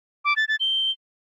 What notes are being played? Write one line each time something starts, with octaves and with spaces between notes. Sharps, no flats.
D6
A6
A6
G7